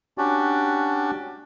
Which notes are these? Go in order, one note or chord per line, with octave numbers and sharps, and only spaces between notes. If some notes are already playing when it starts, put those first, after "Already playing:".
C#4 D4 F#4 G4 D5